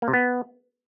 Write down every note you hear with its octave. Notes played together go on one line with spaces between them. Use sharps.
A#3
C3
B3